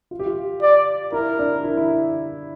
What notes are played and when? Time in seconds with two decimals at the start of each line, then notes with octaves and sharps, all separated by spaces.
0.11 F4
0.19 G4
0.26 F4
0.62 D5
1.12 E4 A#4
1.39 D4
1.63 E4
1.77 E4